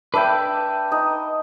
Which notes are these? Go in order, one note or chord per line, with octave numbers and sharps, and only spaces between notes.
D4 B4 E5 G5
D#4 D#5